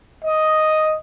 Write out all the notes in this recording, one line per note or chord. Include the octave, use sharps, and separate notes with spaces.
D#5